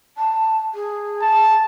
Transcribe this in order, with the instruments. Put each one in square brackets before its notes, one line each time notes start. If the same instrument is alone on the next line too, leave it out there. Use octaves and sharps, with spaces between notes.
[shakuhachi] A5
G#4
[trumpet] A5